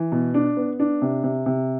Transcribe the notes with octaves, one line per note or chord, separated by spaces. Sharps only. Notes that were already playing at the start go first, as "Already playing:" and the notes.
Already playing: E3
B2
D4
B3
D4
C3
C3
C3